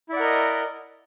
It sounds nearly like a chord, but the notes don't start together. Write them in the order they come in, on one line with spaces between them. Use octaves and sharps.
E4 D5 F#5 A#4 D#5